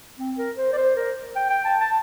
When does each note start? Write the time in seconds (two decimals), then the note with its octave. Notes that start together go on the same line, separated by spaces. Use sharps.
0.18 C4
0.38 A#4
0.57 C5
0.72 D5
0.78 C5
0.96 A#4
1.36 G5
1.50 G5
1.65 A5
1.80 A5